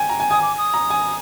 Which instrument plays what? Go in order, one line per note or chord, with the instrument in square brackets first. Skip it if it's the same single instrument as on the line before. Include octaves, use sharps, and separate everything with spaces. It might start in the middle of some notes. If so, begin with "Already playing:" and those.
Already playing: [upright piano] G5 G#5
A#5
G#5
[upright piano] G#5 [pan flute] D#6
[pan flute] D6
D#6
[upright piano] A#5
G#5